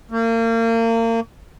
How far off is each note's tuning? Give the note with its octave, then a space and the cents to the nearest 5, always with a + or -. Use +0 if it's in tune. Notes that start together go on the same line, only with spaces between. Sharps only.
A#3 -35